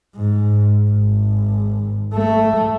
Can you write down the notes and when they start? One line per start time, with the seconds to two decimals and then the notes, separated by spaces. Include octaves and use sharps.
0.16 G#2
0.90 G#1
2.14 A3